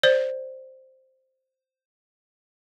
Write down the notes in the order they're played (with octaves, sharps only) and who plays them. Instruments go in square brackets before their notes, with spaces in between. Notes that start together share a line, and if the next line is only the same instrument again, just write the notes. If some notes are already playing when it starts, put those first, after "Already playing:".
[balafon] C5 D5